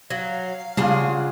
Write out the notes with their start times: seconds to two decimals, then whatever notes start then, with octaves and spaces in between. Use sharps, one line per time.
0.10 F#3 F5
0.77 C#3 G3 D4 F4 G#4 F#5